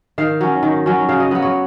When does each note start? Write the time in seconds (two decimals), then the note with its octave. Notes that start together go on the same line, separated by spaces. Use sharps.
0.18 D#3 F5
0.41 F#3 C#4
0.63 D#3
0.86 F#3 C#4
1.09 C#3 F5
1.20 D#5
1.31 F#3 B3 B4
1.42 C#5